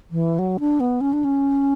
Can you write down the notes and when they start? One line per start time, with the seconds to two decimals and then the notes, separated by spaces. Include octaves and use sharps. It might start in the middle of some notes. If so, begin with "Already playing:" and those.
0.11 E3
0.39 F#3
0.60 D4
0.80 B3
1.01 C#4
1.13 D4
1.24 C#4